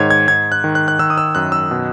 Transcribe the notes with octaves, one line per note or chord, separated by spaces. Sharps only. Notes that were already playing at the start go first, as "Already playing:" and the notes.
Already playing: G#2 D#3 C#5 G#6
G#6
G#2 G#6
F#6
D#3
F#6
F#6
D#3 E6
D#6
E6
F#2 F#6
E6
B2